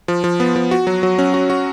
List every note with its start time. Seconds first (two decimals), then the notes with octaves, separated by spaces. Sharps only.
0.08 F3
0.24 F3
0.40 B3
0.56 F3
0.71 F#4
0.87 F#3
1.03 F#3
1.19 C#4
1.34 F#4
1.50 F#4